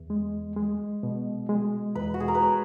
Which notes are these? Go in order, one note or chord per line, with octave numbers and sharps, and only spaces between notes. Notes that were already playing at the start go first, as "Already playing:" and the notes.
Already playing: E2
G#3
G#3
B2
G#3
E2 B4
F#4
G#4
A#4
B4
C#5